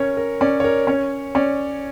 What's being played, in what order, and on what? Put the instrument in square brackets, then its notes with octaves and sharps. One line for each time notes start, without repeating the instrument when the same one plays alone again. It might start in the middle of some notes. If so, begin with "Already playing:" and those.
Already playing: [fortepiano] C#4 [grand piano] A#4 C#5
[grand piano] A#4
[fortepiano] C#4 [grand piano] D5
[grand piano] C#5
A#4
[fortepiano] C#4 [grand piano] C#5
[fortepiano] C#4 [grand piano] D5